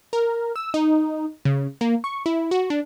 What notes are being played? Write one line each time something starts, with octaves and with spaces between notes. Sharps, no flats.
A#4
E6
D#4
C#3
A#3
C#6
E4
F#4
D4